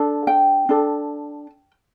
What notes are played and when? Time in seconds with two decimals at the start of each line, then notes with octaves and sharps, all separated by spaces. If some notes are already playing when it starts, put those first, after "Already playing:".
Already playing: D4 A4
0.27 G5
0.69 D4 A4